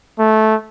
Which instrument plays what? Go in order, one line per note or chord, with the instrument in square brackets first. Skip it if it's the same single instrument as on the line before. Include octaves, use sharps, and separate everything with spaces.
[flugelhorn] A3